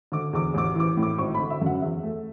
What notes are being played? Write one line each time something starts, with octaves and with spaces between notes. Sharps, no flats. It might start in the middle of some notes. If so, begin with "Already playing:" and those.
D3 D6
E2 D6
A1 D6
E3 D6
A2
D6
G#1 C#6
B5
D3
E5
F#2 F#5
E2 E5
A3